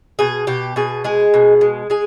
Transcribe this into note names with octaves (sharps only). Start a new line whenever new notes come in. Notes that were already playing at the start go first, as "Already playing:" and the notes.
B2 G#4
B2 G4
B2 G#4
G#3 G#4
B2
G#3
G#3 G#4